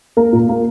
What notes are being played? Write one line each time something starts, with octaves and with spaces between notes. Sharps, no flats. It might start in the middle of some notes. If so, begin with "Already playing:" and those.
A#3 A#4
A#2
A#3